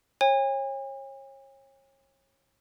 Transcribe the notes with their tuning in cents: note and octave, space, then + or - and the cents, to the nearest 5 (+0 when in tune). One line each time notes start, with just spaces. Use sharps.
C#5 -30 G#5 -45